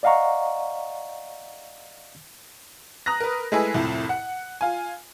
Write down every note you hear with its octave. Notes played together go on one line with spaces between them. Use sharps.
D5 D#5 F5 F#5 A#5 C#6
A#5 D#6 F#6 A#6
A#4 B4
G#3 A3 E4 B4 G#5
C2 F2 A2
F#5
F4 G#5